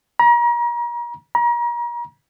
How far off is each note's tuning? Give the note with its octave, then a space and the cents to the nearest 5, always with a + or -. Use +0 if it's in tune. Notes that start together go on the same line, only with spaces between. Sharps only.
A#5 +35
A#5 +35